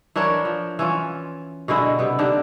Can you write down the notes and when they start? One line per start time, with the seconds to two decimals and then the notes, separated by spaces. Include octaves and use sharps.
0.16 E3 D4 A#4 C#5
0.45 F3
0.79 E3 C#4 F4
1.68 B2 D3 G#3 E4
1.99 C3 B3
2.19 D3 D#3 D4 G4